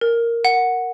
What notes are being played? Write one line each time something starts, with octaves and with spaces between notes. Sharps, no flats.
A#4
F#5